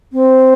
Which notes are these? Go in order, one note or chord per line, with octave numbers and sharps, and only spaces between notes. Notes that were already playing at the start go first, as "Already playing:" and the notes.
C4